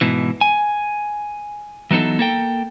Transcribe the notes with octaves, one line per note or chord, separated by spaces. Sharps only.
G#2 B2 E3
G#5
E3 F#3 B3 D#4 A4
A#3 A4 G5